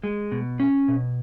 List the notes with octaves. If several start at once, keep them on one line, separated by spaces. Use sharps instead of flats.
G#3
B2
C#4
B2